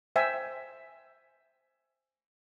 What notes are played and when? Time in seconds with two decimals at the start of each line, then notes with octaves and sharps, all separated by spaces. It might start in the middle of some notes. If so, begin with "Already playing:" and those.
0.16 C5 E5 G5 G#5